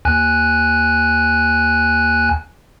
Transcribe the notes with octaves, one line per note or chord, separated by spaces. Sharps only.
D#2 G#5 F#6